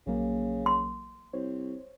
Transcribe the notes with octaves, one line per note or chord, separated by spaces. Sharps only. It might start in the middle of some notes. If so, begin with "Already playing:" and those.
A#1 C#3 F#3 A#3
C6
C2 C5 C#5